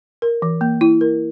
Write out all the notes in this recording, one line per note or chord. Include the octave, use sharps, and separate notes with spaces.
A#4
E3
A#3
E4
A#4